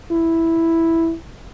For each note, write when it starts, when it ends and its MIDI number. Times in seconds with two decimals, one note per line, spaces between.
0.11 1.14 64